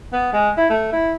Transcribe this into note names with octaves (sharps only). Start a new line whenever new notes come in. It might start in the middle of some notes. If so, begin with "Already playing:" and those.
B3
G#3
E4
A3
E4